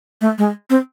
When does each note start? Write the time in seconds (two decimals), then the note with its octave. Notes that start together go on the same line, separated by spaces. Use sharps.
0.21 A3
0.38 G#3
0.70 C4